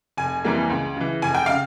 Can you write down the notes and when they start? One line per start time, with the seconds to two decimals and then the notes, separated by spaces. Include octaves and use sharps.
0.17 F1 G#5
0.45 F2 E3 G3 A#3
0.70 C#2
0.97 C#3 E3
1.22 F1 G#5
1.35 G5
1.46 C#3 F5